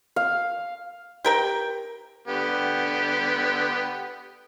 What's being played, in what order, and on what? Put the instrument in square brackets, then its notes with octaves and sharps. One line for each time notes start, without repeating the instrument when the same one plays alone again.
[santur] F5
[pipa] G4 A#4 G5
[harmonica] D3 B3 G4